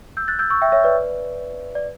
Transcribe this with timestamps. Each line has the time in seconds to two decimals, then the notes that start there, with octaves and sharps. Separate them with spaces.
0.17 E6 G6
0.28 F#6 A6
0.39 E6 G6
0.50 C#6 E6
0.62 E5 G5
0.72 C#5 E5
0.84 B4 D5
1.75 D5